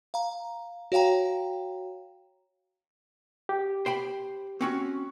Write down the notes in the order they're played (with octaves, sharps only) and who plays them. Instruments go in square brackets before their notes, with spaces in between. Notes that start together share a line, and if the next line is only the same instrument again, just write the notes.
[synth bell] F5 A#5
F#4 C#5 F5 G5 A#5
[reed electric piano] G4
[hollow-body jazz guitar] C5 G5 B5
C4 C#4 F#4